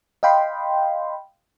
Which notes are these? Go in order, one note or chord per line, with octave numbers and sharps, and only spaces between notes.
D#5 F5 G5 B5 C6